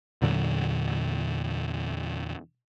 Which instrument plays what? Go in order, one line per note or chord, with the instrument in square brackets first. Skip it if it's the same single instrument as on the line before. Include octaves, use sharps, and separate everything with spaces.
[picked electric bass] E2 A#2 D3 F#3